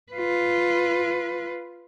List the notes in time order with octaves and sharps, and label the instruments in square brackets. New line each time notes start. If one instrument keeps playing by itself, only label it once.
[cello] F4 B4